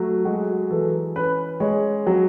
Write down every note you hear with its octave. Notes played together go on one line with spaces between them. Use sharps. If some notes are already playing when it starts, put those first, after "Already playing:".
Already playing: F#3 A3
G#3 F#4
E3 A4
C#4 B4
G#3 C#5
F#3